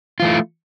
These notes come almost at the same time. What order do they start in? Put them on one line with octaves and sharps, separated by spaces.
F4 E3 A3